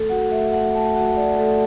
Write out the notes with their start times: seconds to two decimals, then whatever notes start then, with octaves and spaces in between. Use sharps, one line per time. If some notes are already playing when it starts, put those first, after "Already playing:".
Already playing: A3 A4
0.10 F#4 F#5
0.31 A3 E5
0.52 A3 F#5
0.74 A3 A5
0.96 F#4 F#5
1.17 F#4 D5
1.39 A3 A4